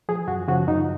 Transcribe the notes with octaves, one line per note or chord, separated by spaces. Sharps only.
F3 G#4
F#2 F#4
C#3 F3 F#4
F#2 D#4